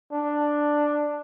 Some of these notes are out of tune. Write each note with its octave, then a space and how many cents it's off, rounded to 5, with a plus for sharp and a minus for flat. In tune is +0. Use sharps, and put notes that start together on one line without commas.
D4 +5